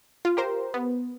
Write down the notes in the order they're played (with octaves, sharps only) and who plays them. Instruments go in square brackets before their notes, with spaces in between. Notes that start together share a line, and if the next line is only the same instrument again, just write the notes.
[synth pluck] F4
G4 A#4 C5
B3